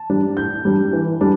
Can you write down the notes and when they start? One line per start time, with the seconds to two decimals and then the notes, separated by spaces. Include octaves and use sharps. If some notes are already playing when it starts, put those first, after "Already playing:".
Already playing: A5
0.10 G3 D4
0.37 A2 G6
0.65 G3 D4
0.93 E3
1.21 G3 D4